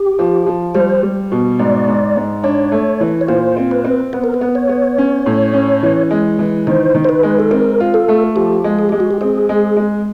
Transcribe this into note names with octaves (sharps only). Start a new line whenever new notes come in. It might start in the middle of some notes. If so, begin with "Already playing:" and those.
Already playing: G4
F3
F3
G3 C5
G3
B2
G#2 D5
G#2
G#2
D4 C#5
A3
E3
C#5
A#2 C5
C4
B4
C4
B3 B4
A#4
B4
B3
C#5
B3
C#4
A2
C#4
E3
G#3
E3
D#3 C5
D#3
C5
B4
G#3
A4
C4 A#4
F4
A4
A3
F3 G4
G#3
G#4
G#3 G4
F#4
G4
C4 G#4
G#3
G#3